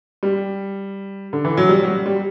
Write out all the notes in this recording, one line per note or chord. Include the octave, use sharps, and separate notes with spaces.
G3
D3
E3
F#3
G3
F#3
G3
G3